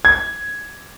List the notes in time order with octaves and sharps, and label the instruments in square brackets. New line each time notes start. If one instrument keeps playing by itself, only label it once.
[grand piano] G#6